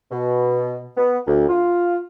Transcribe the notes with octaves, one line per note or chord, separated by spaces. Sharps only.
B2
B3
D2
F4